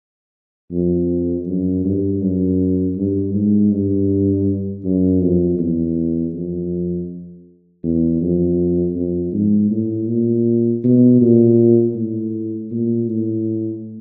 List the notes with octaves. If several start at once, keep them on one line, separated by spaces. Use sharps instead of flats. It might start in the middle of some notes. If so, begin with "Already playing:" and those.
F2
F#2
G2
F#2
G2
G#2
G2
F#2
F2
E2
F2
E2
F2
F2
G#2
A2
A#2
B2
A#2
A2
A#2
A2